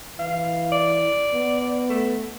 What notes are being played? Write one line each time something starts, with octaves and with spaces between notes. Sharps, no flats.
E3 F5
D5
B3
A3